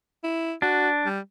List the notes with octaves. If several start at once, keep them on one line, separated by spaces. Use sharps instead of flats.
E4
D4 F#4
G3